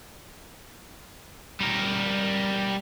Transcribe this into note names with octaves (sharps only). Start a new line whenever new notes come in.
G3 A#4